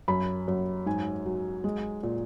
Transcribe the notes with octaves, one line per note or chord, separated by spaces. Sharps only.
F#2 B5
F#2
G#2 G#5
F#3
G#3
A#2